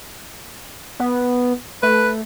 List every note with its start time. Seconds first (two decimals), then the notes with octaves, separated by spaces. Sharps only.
1.00 B3
1.83 A3 B4